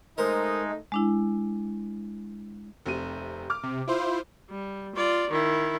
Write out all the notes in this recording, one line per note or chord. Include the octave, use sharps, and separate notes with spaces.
G#3 A3 D#4 A#4 C5
G#3 D4 E4
F1 C3 D#7
D6 F6
C3
E4 F4 C5
G3
F4 D5
D#3 E4